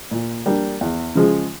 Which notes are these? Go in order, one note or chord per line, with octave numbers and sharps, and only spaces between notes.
A#2
G3 A#3 D4 G4
E2
C#3 F3 G#3